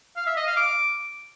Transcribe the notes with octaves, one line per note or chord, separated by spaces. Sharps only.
F5
E5
D#5
F5
D6